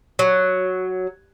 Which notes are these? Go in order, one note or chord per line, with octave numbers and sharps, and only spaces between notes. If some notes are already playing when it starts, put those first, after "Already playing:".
F#3